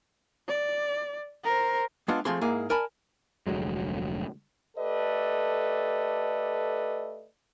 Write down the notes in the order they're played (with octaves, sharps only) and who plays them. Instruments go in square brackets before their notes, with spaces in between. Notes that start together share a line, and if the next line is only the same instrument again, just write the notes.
[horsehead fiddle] D5
A#4 C5
[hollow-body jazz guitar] G#3 B3 D4 F4
F3 A3 C4 G#4 C6
G#2 A#3 E4 G#4
A#4 D5 G#5 A5 B5
[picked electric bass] F1 D2 F#3 G#3
[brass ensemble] A3 G4 A4 B4 D5 D#5